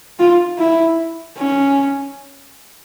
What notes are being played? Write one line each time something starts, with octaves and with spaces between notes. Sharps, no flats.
F4
E4
C#4